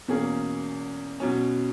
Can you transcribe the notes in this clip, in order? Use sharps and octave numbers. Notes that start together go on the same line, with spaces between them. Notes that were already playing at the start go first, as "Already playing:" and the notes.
E2 B2 A#3 C#4 G#4
B2 F#3 C#4